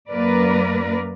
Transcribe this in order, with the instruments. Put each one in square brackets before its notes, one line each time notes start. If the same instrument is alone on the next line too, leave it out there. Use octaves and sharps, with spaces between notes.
[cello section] F#2 A#3 A#4 B4 D5